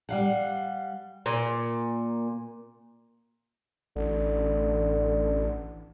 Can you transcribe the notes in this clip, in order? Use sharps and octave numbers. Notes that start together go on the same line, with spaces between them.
G3 F5 F#5
A#2
A1 D3